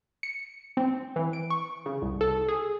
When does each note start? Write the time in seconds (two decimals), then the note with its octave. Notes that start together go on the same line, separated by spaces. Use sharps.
0.23 C#7
0.77 C4
1.16 E3
1.33 D7
1.50 C#6
1.86 C#3
2.02 C2
2.21 A4
2.48 G#4